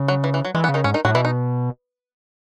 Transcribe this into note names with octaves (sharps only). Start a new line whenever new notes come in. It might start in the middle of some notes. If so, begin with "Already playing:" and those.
Already playing: C#3
F#3
E3
E3
F#3
E3 G#3
B3
C#3
D#3 D#4
G#2 C#4
D#3 D#4
A2 F#3 F#4
B2 E3 E4
D#4